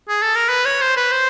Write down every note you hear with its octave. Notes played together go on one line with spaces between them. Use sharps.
G#4
A4
A#4
B4
C#5
C5
B4
C5